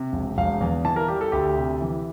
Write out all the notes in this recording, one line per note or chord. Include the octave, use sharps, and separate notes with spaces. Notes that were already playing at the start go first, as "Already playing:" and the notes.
Already playing: C3
E1
E1 F5
E2
E3 A5
A#4
G3 G4
A4
D2 G4
C3
E3